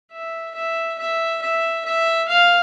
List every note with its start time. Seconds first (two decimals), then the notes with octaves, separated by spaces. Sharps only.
0.12 E5
0.55 E5
0.99 E5
1.42 E5
1.85 E5
2.28 F5